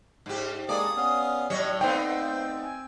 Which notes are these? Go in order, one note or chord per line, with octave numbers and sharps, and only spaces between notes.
G#2 G4
G#3 A#3 A4 D5 D#6
B3 C#4 F5
A2 F#3 G4 C#5 D#5
A3 B3 C4 D#4 C5 G5 E6
G#5